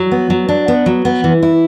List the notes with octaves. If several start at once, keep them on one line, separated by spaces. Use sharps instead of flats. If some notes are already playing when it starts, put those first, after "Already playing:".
Already playing: F#3
B3
F#3
D4
B3
F#3
B3
E3
E4